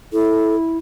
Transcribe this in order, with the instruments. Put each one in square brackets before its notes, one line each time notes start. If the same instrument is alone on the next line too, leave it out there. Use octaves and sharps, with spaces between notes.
[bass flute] E4 [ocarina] A4